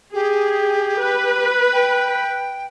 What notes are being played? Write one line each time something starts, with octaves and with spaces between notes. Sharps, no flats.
G4 G#4
B4
G5